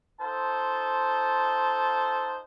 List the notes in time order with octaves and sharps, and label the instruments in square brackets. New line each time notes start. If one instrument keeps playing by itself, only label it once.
[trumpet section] D#4 F4 A4 C5 A5